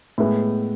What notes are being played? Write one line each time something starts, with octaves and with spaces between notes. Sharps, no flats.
A2 G#3 B3 E5